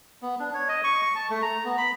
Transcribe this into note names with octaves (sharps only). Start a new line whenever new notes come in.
B3
D4
C#5
D#5
C#6
C#6
A5
A3
A#5
B3
B5